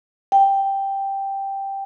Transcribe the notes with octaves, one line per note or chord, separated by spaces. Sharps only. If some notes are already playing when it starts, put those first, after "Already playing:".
G5